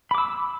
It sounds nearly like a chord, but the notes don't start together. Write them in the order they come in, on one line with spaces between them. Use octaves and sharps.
B5 D6 E6